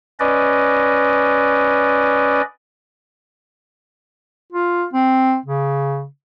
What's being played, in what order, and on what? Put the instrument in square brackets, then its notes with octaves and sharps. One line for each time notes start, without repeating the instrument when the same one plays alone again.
[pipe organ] C#4 B4 D5 D#5
[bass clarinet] F4
C4
C#3